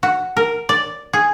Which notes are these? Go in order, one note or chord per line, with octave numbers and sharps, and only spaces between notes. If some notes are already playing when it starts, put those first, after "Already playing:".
F#4
A#4
D5
G#4